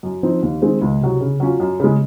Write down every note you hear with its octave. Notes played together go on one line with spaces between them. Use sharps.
F#2
F3 C4 D#4
D#2
D#3 G#3 C4
C#2
C3 F#3
C#3
F#3 C#4 F4
F#2
C#3 G#3